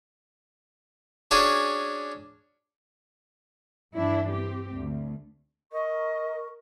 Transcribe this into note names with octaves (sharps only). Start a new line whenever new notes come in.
C#4 D4 F#4 G#4
G2 E3 D4 E4
C4 G4
D2
A#4 D#5 C#6